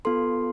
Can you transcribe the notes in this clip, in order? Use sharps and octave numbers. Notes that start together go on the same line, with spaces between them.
B3 F4 A4 C6